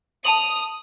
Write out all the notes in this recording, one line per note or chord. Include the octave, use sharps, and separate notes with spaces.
A5 D#6 F7 F#7